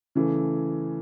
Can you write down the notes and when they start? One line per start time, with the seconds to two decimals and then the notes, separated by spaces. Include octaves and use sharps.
0.15 C#3 E3 A3